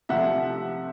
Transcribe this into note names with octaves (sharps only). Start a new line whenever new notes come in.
C3 F3 A3 E5 F#5